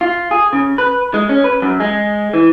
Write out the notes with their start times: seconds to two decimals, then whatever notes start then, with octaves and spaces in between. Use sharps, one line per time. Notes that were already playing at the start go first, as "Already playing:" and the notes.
0.01 F4
0.31 G#4
0.53 C#3
0.78 B4
1.14 G#3
1.29 C#4
1.44 B4
1.62 F#2
1.80 G#3
2.34 E3